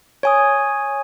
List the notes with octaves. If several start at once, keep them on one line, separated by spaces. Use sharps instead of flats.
C#5 G#5 D#6